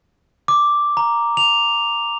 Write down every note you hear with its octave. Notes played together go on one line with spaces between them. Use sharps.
D6
A#5
F7